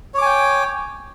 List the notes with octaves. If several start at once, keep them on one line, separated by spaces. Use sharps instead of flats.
C#5 G5 G#5 D6